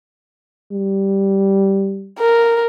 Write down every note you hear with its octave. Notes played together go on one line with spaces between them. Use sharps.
G3
A#4